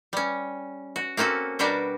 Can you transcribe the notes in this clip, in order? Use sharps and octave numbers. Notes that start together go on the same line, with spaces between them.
G3 C#4
F#4
A#3 C4 C#4 F#4 A4
B2 G3 D4 F#4 G4 A#4